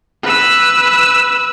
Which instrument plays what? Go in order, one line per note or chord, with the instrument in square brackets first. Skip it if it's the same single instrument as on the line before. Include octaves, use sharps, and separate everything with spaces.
[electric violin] B4 E6